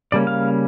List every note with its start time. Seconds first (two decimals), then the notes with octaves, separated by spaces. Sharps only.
0.12 C#3 G3 A#3 C#4 D5
0.27 F5